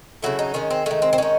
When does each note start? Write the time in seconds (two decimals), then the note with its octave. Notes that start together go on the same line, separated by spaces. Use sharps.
0.22 C#3 F#3 A3 E4
0.39 D#4
0.54 D#3 G#3 C#4
0.70 C4
0.86 D#3 G#3 A3
1.02 C4
1.13 C4
1.18 D#3 G#3 C#4